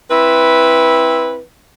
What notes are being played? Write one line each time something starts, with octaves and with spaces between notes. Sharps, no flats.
C4 E4 B4